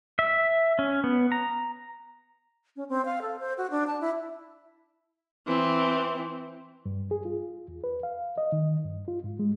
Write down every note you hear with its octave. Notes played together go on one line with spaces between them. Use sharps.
E5
C#4
B3
A#5
C#4
C4
F5
A4
C5
F#4
D4
A5
E4
E3 C4
G2
G#4
F4
E2
B4
F5
D#5
D#3
G2
F4
G#2
G#3